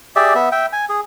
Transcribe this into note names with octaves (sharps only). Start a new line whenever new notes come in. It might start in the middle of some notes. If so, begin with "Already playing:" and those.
G4 G#4 D5 E5
B3 E5
E5 G5
G#5
G#4